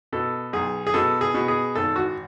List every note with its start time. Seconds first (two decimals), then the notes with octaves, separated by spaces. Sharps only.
0.13 B2 A4
0.53 B1 G#4
0.87 G#4
0.94 B2 A4
1.21 G#4
1.34 B2
1.48 G#4
1.75 G#1 A4
1.96 F#4